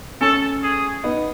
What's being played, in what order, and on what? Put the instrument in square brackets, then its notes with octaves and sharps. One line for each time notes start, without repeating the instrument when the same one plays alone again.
[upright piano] A3 C#4 [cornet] A4
[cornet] G#4
[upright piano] B3 D#4